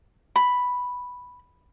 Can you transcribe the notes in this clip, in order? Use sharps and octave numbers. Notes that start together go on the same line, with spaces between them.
B5